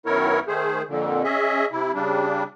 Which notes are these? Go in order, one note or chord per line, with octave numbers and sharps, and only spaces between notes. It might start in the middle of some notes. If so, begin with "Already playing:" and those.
F#2 D#3 B3 E4 A#4 C#5
D#3 A3 G#4 C5
F2 A#2 D3
C#4 G#4 D#5 E5
C3 E4
C#3 G3 D4